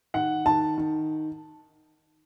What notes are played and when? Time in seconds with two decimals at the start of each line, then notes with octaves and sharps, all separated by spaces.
0.14 D#3 F#5
0.46 D#3 A5
0.78 D#3